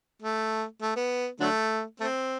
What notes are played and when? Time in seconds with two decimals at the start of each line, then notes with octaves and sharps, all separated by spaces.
0.22 A3
0.81 A3
0.96 B3
1.40 D3 F#3 A3
2.00 A3 C4